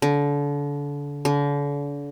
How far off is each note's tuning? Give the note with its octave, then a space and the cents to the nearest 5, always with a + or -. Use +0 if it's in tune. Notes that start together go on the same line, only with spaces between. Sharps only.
D3 -30
D3 -40